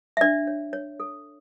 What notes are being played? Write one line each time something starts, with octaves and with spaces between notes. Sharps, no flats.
E5
D4 D5
C#5
C#5
A4